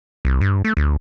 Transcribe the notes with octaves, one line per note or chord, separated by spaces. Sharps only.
C2
G2
A3
D2